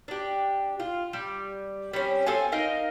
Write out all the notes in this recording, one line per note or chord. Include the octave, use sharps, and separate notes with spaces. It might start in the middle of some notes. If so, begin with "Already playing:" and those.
D4 G4
F4
G3
G3 C4 C#4
C4 A4 F5 G#5
D#4 A#4 D#5 F5